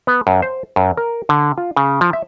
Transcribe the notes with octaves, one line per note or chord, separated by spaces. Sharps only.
B3
F#2
C5
F#2
A#4
D3
F4
C#3
F3
E5